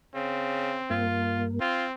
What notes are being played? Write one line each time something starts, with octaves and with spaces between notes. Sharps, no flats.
C#3 C4
G2 A#3 F4
C4 F4